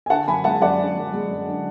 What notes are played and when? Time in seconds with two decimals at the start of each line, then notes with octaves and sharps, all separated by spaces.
0.06 G#5
0.10 D3 F#5 A5
0.27 F#2 G#5 B5
0.44 G#3 F#5 A5
0.62 F#2 D5 F#5
0.79 D3
0.97 F#2
1.13 G#3
1.31 F#2
1.47 D3